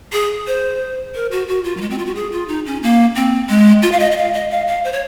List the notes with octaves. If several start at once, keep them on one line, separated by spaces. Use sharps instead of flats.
G#4
C5
A#4
F#4
F#4
F4
F#3
G#3
C4
F4
F#4
G#4
F4
D#4
C#4
A#3
C4
G#3
F4
F5
D#5
D#5
F5
D#5
F5
F5
C5
C#5